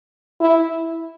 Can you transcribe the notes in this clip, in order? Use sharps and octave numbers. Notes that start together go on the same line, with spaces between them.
E4